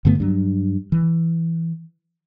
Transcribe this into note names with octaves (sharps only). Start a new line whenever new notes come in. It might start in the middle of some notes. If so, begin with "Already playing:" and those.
G2 D3 A3 B3
G2 F#3
E3